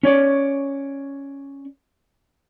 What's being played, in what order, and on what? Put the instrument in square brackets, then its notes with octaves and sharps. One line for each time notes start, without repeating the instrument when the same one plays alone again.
[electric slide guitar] C#4 C#5 D5